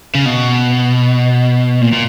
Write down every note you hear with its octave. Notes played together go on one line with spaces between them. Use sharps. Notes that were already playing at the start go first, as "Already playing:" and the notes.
C#3
B2
A#2
A#2